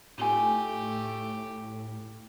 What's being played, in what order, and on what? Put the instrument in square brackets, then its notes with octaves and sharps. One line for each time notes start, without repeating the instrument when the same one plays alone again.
[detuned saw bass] A2 [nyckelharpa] A3 G4 [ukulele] D#4 F4 G#5